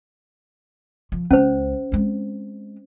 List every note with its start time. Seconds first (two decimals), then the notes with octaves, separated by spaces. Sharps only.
1.12 F3
1.31 C#2 C#4 C5
1.92 G#3 C4